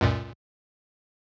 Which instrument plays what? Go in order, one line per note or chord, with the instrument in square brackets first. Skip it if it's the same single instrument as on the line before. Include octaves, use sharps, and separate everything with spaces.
[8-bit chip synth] C#2 F#2 A#2